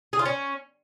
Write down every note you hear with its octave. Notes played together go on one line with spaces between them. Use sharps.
G#4
F4
C#4